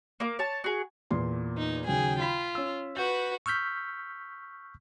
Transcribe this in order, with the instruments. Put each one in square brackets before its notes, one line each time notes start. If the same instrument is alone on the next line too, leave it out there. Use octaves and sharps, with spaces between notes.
[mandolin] A#3 D6
C#5 A5
F#4 G#4
[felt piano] E2 A#2 C6
[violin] D#4
[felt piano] D#2 C#3 F#3 [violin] G#4 G5
[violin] F4 [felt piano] B5 B6
[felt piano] C#4 E6
[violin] F#4 B4 [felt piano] G6
[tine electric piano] C#6 E6 F6 G6 B6